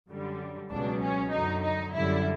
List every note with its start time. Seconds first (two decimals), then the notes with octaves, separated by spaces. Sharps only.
0.08 F#2 D3 G3
0.70 C#2 B2 F#3 D4
1.01 C#4
1.31 F#2 D3 F#3 D#4
1.63 D#4
1.93 F#2 D3 G3 E4